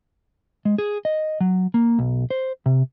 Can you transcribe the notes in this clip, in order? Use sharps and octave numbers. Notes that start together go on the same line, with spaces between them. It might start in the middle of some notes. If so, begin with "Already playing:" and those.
G#3
G#4
D#5
F#3
A#3
B1
C5
C3